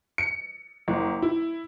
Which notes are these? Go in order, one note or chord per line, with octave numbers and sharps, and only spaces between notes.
C#7
F#1
E4